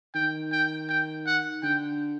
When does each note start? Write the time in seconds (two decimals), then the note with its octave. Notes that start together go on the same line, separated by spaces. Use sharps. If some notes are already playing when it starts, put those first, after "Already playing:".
0.15 D#3 G5
0.52 G5
0.89 G5
1.26 F#5
1.63 D3 G5